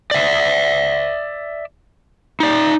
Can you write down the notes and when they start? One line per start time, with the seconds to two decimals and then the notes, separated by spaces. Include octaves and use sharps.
0.11 D5 E5
2.40 D#4 D5